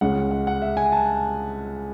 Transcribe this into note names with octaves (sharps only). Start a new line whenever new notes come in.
C#2 C#3 G#3 C#4 F#5
F#5
F#5
E5
G#5
A5